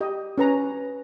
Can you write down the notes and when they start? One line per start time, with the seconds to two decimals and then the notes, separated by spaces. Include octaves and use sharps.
0.01 G4 D#5
0.38 C#4 B4 A#5